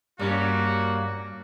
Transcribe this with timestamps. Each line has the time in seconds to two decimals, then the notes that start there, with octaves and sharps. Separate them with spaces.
0.19 G2 G3 A#3 C#4 F#4